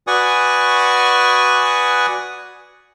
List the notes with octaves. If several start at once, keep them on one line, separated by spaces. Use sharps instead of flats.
F#4 B4 D5 G#5 C#6 D#6